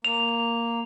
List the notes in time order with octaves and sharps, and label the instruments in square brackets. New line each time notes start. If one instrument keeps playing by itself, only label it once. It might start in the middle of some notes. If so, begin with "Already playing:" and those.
[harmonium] A#3 [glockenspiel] F7